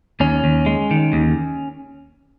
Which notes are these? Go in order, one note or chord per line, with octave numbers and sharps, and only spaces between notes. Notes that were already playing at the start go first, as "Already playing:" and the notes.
D#2 C#4
D#2
G#3
D#3
D#2